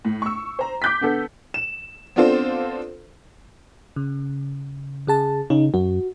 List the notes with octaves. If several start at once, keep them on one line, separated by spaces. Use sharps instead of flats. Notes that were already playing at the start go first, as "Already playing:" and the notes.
A2
C#6 E6
C5 A#5
D6 G6 B6
D3 B3 A4
E7
B3 C4 D4 F4 A4 C5
C#3
C#3 G#4 A5
C#3 D#4
F#2 F#4